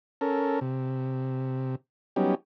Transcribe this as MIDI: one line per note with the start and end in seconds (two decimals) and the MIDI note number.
0.21 0.60 61
0.21 0.60 69
0.21 0.60 70
0.61 1.75 48
2.16 2.35 54
2.16 2.35 55
2.16 2.35 59
2.16 2.35 61
2.16 2.35 63
2.16 2.35 67